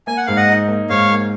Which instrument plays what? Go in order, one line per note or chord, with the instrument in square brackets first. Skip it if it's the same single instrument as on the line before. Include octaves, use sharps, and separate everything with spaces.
[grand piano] A#3 [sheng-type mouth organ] G#5
[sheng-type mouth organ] F#5
[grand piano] G#2 [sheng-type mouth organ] F5
[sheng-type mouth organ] D#5 F#5
[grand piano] D#4
A#3
[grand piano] G#2 [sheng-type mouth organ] C#5 F5
[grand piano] A#3